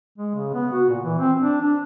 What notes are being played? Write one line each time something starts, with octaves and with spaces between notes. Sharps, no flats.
G#3
C#3
B3
F#4
A#2
E3
C4
D4
D4